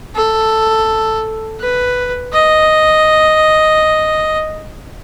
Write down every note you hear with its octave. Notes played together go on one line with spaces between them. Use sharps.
A4
B4
D#5